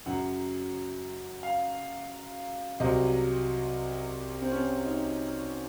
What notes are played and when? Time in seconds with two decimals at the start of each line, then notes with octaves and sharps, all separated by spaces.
0.06 F#2 C#3 F#3 F#5
1.43 F5
2.80 C2 C3 F#3 D#5
4.41 C4
4.52 C#4
4.85 D#4